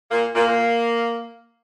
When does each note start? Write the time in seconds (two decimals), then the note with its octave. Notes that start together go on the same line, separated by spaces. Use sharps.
0.11 A#2 A#3
0.35 A#2 A#3
0.48 A#2